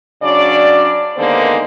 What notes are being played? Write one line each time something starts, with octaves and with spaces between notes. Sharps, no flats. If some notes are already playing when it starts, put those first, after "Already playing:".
C#3 F#3 D4 D5
D3 D#3 G#3 A#3 B3 C5